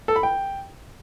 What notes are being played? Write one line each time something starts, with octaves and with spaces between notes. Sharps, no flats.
A4
B5
G5